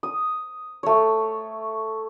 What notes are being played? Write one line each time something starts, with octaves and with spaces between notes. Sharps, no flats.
D#6
A3 C#5